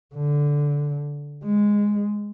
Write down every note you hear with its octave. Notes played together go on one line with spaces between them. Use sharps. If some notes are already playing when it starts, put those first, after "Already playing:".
D3
G#3